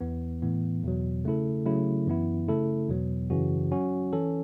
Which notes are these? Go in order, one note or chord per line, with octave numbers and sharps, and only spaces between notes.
E2 E3 B3
A2 E3 B3
E2 B2 F#3
C#3 A3 E4 A4
C#3 F#3 A3 E4
F#2 E3 B3 E4
C#3 A3 E4 A4
E2 B2 F#3 B3
F#2 C#3 E3 C#4 F#4
F#3 C#4 F#4
E3 C#4 A4